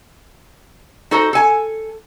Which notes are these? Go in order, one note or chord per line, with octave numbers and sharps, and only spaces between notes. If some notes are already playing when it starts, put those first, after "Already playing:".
D#4 F#4 A4 C5
A4 G#5